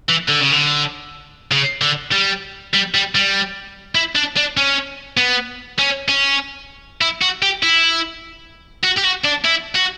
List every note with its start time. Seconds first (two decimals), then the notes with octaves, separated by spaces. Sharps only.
0.09 E3
0.29 D3
0.41 C#3
0.52 D3
1.52 C#3
1.82 D3
2.12 G3
2.74 G3
2.94 G3
3.15 G3
3.95 E4
4.15 D4
4.37 D4
4.57 C#4
5.17 B3
5.79 C#4
6.09 C#4
7.01 E4
7.22 F#4
7.42 G4
7.63 E4
8.84 F#4
8.98 G4
9.05 F#4
9.25 D4
9.45 E4
9.76 F#4